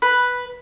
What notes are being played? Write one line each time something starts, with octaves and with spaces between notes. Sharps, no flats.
B4